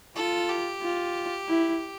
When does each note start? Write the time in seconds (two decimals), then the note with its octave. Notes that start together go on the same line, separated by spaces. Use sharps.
0.16 F4 A4
0.49 G4
0.82 F4
1.48 E4